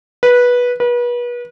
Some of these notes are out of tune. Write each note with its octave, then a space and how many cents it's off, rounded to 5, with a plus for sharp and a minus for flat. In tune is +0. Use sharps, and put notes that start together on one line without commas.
B4 -15
B4 -35